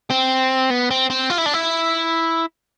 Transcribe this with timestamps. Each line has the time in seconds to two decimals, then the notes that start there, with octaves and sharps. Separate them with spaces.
0.11 C4
0.71 B3
0.91 C4
1.10 C4
1.30 F4
1.38 E4
1.46 D4
1.54 E4